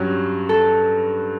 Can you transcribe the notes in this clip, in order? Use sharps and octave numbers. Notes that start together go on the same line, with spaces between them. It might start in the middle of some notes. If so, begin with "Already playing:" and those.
Already playing: G2 F#3 C#4 G4
A4